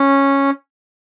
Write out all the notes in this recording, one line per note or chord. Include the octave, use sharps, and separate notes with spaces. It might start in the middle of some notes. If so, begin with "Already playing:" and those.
Already playing: C#4